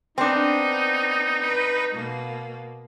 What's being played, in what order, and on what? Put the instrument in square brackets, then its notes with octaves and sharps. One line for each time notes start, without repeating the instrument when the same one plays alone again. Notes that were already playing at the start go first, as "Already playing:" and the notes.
[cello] B3 [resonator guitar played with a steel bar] C4 D4 [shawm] D#4
[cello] B4
B2 A#3